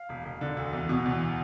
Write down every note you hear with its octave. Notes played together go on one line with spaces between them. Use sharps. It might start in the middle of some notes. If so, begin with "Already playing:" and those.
Already playing: F5
E1
E1
D3
D2
E2
B2
E2